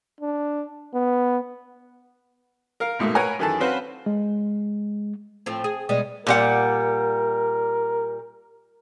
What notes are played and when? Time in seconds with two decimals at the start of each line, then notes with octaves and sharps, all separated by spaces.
0.21 D4
0.94 B3
2.80 A#4 F5
2.99 A#1 G#2 B2 A3 A#3
3.15 A#4 B4 C#5 F#5 G#5 A#5
3.39 F#2 D#3 E3 G#4 A4 A5
3.60 C4 C#4 F#4 B4 C5 F5
4.06 G#3
5.46 A2 F3 C4
5.64 G#4
5.89 B2 G3 G#3
6.27 A#2 G3 A#4 F#5